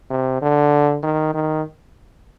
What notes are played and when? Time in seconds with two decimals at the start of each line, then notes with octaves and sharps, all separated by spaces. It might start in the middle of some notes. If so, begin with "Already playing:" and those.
0.10 C3
0.42 D3
1.03 D#3
1.34 D#3